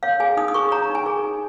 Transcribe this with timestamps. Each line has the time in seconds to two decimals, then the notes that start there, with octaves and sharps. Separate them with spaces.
0.03 C#5 F5
0.20 G#4 G#5
0.37 D#4 D#6
0.48 D#6
0.54 G#4 C#6
0.71 C#5 A#5
0.90 D#4
0.95 G#5
1.06 G#4
1.24 D#4